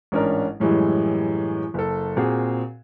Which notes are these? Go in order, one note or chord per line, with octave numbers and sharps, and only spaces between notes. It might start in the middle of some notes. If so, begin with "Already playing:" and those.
A1 G#2 C#4 D4 A#4
F#2 A2 E3 G3 G#3
F#1 A4
A#2 C4 F#4 G#4